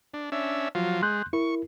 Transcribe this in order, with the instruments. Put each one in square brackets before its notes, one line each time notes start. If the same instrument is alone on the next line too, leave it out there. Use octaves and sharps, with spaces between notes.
[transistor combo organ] D4
C#4 D4 E5
F3 F#3 F4
[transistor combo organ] G#3 [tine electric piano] C6 F#6 G6
[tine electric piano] E4 A#4 [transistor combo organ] C#6